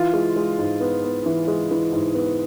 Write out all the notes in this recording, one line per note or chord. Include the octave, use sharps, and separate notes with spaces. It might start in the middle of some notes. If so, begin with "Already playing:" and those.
Already playing: E3 F4
G#3
G#3
G#2
B3
B3
E3
G#3
E3
G#2
B3